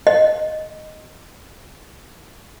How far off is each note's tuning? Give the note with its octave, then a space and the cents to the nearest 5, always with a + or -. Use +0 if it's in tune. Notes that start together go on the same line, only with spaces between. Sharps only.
D#5 -5